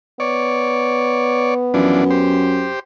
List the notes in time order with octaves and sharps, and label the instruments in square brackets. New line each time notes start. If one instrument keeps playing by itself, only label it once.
[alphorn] B3 [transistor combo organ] C#5 D5
[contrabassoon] F#2 [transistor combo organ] E3 F3 D4
[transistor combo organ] G4 C5